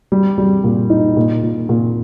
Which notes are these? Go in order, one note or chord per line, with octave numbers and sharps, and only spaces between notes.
G3
G3
A#2
D#4
A#2
A#2
A#2